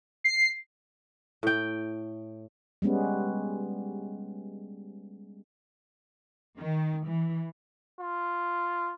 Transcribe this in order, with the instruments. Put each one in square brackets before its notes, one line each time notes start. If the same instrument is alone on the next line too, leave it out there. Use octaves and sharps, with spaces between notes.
[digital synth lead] C7
[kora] A2 G5
[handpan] G3 G#3 B3 C#4
[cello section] D#3
E3
[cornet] F4